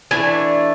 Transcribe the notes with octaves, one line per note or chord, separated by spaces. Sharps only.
E3 A3 D4 G#5